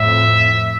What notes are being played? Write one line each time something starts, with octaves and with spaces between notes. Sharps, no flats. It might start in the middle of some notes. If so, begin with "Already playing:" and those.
Already playing: F2 A2 E5